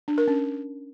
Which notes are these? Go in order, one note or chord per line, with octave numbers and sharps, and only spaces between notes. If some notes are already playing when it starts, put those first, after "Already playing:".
D4
A#4
C#4